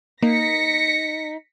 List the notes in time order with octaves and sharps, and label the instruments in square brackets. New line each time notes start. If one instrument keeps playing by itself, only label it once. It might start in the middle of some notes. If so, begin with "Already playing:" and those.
[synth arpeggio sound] A#3 [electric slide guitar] D#4 [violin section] A#6 B6 C#7